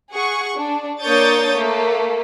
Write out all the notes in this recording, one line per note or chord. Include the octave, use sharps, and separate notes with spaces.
G#4 F#5 C#6
D4
A#3 D4 C#5 D#6 G6 A6
A3 A#3